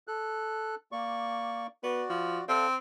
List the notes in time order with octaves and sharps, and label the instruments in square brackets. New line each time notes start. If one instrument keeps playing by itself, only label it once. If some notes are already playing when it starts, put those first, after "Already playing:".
[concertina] A4 F#6
A#3 D5 C#6
[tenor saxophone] B3 [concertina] F#4 D5
[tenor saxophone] F3
[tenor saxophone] C4 [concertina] A4 D5 F5